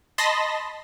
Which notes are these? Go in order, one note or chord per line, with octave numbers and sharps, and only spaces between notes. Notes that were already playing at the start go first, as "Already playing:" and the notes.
D#5 A5 B5 C6 A#6